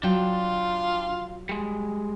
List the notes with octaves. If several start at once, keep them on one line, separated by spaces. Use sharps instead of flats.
F#3 D4 F4 G5
G3 G#3